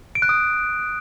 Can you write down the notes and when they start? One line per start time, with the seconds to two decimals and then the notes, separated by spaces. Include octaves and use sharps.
0.15 D7
0.22 F#6
0.29 D#6